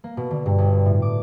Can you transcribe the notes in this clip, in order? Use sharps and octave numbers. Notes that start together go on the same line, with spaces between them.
A#3
B2
D3
G2
G1
A2
D6